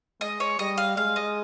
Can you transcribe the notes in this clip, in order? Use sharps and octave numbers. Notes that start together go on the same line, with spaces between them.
G#3 D#5
C#5
G3 D#5
F5
G#3 F5
D#5